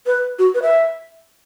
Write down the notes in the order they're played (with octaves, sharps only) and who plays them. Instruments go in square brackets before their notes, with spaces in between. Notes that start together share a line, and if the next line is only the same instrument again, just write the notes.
[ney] B4
F#4
B4
E5